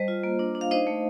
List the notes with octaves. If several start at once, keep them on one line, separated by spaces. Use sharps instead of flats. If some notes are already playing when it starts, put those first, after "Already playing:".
Already playing: G3 C5 D#5
F4
A#3
D4
D4
F5
D#4 C5 D#5
A3